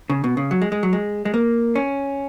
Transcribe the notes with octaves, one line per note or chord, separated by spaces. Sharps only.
C#3
B2
C#3
F#3
G#3
G#3
F#3
G#3
G#3
A#3
C#4